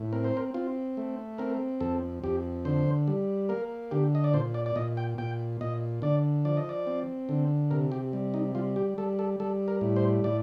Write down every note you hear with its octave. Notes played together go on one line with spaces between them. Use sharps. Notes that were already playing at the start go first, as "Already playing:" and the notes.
Already playing: A2
C4 A#4
C5
A#4
C4 F4
A3
C4 A#4
F2 A4
F2 G4
D3 C5
G3
A#3 A#4
D3 G4
D#5
D5
A#2 C5
D5
D5
A#2 D#5
G5
A#2 G5
A#2 D#5
D3 D5
F3 D5
D#5
D5
C4
D3
C3 A#4
G4
G3
D#4
G3 F4
G4
G3 A4
A4
G3 A4
A#4
A2
C5
A2 D5